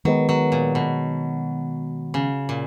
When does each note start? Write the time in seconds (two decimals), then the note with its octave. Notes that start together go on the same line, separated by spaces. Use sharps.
0.05 D#3 F#3 G#3 B3
0.29 F#3
0.52 A#2
0.75 B2
2.14 C#3
2.49 A#2